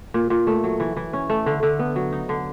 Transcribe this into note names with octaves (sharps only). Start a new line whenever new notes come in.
A#2
A#2
A3
F#3
E3
E3
C#4
A3
D3
D3
B3
F#3
D#4
D3